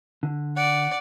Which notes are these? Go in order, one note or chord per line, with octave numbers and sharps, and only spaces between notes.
D3
D5 F#5